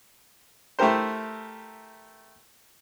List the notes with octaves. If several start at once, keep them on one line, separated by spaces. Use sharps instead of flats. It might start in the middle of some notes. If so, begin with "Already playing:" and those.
A3 E4 G4 A#4 C5